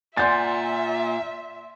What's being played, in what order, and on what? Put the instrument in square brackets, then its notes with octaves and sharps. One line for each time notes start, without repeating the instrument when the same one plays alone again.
[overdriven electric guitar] A#2 [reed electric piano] D5 F#5 G#5 [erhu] E5 [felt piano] C6 G6 A6